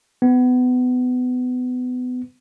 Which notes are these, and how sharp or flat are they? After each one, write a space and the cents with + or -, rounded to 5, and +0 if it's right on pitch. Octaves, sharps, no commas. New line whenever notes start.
B3 +25